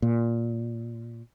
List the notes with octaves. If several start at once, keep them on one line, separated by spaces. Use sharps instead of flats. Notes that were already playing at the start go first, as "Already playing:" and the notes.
A#2